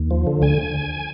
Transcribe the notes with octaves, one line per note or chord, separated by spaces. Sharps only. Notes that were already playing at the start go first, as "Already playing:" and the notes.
Already playing: D#2
F3
D3
D2 G#5